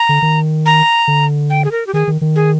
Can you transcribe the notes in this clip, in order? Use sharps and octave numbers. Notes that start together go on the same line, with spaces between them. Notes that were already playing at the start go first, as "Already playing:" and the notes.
Already playing: A#5
D3
D#3
A#5
D3
G5
G#4
A#4
G4
D#3 G#4
D#3
D#3
G#4